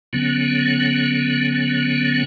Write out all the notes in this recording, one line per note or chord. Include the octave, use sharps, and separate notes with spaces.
D3 F#3 B3 C#4